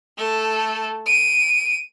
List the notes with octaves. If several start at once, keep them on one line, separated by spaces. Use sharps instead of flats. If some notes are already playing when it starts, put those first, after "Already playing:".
A3 A4
D7 D#7